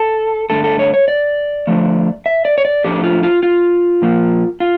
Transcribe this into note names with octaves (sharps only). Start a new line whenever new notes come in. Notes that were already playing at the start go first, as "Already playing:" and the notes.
Already playing: A4
G2 D3 A3 A4
A4
C#5
C#5
D5
D3 F3 A3
E5
D5
C#5
D5
A2 F3 A3 D4 G4
F4
F4
F4
A#2 F3 A#3
F4